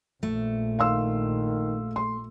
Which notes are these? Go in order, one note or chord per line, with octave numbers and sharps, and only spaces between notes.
A#1 A3
D#3 F5 C6 E6
C6